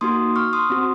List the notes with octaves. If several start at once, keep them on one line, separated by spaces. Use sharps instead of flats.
A#3 D#4 F#4 C6 D#6
C#6 F6
C6 D#6
C4 F#4